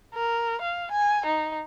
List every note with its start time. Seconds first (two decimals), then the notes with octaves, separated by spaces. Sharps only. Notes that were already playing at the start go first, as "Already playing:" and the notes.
0.14 A#4
0.61 F5
0.91 G#5
1.26 D#4